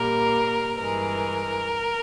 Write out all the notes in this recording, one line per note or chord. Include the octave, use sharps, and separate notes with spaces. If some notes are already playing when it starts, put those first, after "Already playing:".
Already playing: A#2 G3 A#3 A#4
G2 E3 G#3 A#4